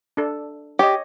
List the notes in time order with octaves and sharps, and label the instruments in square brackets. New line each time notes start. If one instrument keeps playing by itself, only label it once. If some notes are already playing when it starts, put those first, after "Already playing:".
[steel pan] D4 A4
[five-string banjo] G4 [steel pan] C#5 D#5